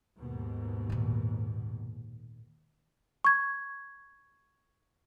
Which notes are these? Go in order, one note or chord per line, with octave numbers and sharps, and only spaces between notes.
D#2 G#2 B2
A#2 D#3
C#6 G#6